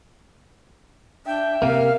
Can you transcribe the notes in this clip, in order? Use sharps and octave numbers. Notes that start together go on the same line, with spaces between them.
D4 E5 G5
C3 A#3 A#4 F5